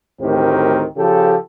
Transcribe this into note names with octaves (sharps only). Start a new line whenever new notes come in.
D2 A2 D#3 C4 G4 A#4
C#3 F3 G4 A4